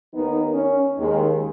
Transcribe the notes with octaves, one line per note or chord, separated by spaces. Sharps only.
D#2 D#3 B3 D#4
C#4
D#2 D#3 G#3